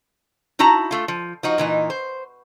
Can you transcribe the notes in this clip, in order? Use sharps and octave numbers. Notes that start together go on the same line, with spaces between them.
D#4 E4 F#4 A5 A#5
A3 F4
F3
F3 D#4 F#4
A#2 E3 D#4
C5